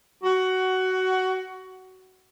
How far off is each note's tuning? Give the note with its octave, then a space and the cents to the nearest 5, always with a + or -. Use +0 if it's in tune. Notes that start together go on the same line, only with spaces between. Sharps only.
F#4 +15